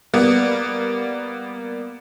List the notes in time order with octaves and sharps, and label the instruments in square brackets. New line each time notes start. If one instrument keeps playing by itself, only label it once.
[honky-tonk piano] G3 A#3 B3